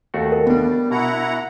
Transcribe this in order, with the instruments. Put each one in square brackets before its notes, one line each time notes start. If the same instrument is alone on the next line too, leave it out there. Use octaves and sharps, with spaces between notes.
[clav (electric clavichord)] D#2 A3 F#4
[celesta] A#4
[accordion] G3 [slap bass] B3 D4
[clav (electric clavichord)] B2 [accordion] E4 F#5 A#5